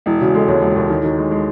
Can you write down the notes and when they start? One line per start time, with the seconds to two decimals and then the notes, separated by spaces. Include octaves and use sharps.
0.06 E1 E4
0.20 C#3 F#4
0.34 G#3 A4
0.48 D#2 C#5
0.62 E1
0.76 D#2
0.90 D#3
1.03 D#3
1.18 G#3
1.31 G#3